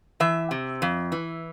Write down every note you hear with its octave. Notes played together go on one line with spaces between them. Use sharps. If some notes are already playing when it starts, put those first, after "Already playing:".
E3 E5
C3
F2
E3